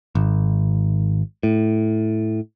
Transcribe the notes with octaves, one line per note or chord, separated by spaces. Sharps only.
G#1
A2